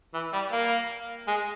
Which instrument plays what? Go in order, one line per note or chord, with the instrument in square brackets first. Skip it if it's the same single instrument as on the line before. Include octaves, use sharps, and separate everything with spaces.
[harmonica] E3
G3
A#3
G#3